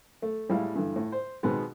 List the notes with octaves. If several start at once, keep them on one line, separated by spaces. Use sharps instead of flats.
A3
A2 G3 G#3 E4 F5
G2 D3 E3
A2
C5
B2 D#3 G#3 B3 C4